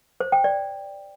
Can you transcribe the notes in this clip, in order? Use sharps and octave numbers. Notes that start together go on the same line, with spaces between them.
C5
G5
D5